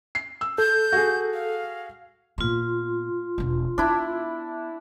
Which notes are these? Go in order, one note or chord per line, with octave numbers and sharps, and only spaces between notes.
C7
E6
A4 G6
F#4 G#4
F5
A#2 B3 F4 C6
E1 B3
B3 D4 E4